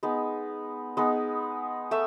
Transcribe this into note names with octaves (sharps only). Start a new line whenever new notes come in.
G#3 B3 D#4
G#3 B3 D#4
A3 E5